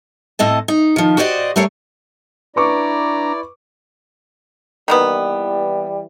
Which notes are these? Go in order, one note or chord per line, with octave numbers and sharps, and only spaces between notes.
A2 C4 D#5 A5
D#4
D#3 F3
F#4 G4 C5 D5 D#5
G3 A3 A#4 C5 C#5
D4 E4 B4 D5 A#5 C#6 D6
D#3 E3 G3 A#3 B3